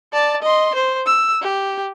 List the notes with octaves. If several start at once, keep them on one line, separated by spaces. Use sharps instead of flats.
D5 A5
D#5 C6
C5
E6
G4